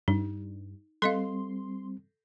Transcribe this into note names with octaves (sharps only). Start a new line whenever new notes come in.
G2 D#4
G3 C4 A4 D#5 F5 C6